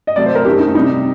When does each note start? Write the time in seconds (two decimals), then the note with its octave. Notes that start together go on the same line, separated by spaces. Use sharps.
0.07 D#5
0.16 C3 F#3 A3 D5
0.26 C5
0.35 A#4
0.45 F#2 D#3 A3 G4
0.60 D#4
0.74 C3 G3 D#4